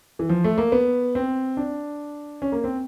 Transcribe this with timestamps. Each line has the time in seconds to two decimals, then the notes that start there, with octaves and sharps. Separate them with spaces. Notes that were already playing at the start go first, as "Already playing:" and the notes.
0.19 E3
0.29 F3
0.44 A3
0.58 A#3
0.72 B3
1.15 C4
1.57 D4
2.42 C#4
2.52 A#3
2.64 C4